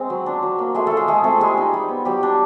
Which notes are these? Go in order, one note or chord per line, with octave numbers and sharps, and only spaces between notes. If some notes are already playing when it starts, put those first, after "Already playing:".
Already playing: G#3 C4
F#3
D4
F#3
A#3
G#3 A3 G#4
A3 F4 A4
G#3 G#4
G#3 A3 G#4
A3 C4 A4
G3 G#3 G#4
D#4
G3
B3
F#3 G3 G4
D4